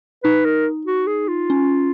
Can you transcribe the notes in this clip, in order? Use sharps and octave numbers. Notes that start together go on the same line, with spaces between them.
D#4 B4
A#4
F#4
G#4
F4
C#4